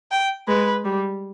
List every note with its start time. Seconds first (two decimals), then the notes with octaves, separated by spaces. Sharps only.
0.11 G5
0.48 G#3 B4
0.85 G3